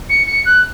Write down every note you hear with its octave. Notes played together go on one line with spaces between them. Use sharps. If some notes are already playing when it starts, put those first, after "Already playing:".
C#7
C#7
F#6